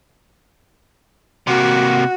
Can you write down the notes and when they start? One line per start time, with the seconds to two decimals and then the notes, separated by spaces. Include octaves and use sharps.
1.47 C3 A#3 F#4